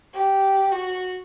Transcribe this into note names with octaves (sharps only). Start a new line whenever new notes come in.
G4
F#4